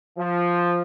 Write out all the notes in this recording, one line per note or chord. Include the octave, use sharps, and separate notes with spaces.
F3